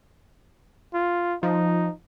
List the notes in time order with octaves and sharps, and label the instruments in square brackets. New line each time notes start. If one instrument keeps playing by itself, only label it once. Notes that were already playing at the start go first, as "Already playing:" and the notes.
[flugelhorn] F4
[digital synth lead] F3 [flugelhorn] D#4